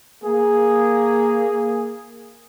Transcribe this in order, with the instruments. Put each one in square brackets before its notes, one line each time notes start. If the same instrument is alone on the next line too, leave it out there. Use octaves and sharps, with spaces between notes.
[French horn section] A#3 [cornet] G#4